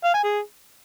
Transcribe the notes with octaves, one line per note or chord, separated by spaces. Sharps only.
F5
G#5
G#4